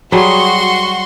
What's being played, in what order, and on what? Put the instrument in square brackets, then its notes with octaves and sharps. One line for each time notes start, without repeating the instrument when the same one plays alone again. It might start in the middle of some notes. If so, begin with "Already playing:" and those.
[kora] F#3 G3 G#4 [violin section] F#4 C6 C#6